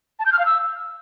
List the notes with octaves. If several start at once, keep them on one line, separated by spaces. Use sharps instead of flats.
A5
G6
F6
F5
E6